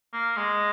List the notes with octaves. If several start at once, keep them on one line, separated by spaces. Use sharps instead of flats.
A#3
G#3